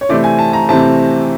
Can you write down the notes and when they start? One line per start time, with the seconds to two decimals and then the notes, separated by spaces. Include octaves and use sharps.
0.01 C#5
0.09 C3 E3 A3 C4 D5
0.24 G#5
0.39 A5
0.53 A#5
0.69 C3 E3 A3 C4 A5